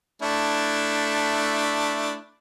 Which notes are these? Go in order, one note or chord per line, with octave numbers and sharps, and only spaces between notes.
A3 D4 E4